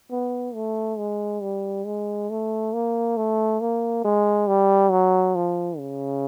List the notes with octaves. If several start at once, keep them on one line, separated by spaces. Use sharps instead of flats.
B3
A3
G#3
G3
G#3
A3
A#3
A3
A#3
G#3
G3
F#3
F3
C#3